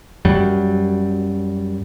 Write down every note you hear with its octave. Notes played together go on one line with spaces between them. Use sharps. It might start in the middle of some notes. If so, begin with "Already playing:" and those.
F#2 F#3 G3